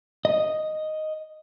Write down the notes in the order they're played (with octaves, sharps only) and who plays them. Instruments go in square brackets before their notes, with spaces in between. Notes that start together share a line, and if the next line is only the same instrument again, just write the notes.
[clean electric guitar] D#5